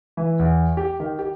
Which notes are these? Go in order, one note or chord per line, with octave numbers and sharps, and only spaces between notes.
E3
E2
G4
D#3
G4